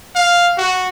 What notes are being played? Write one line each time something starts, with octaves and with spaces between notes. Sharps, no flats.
F5
F#4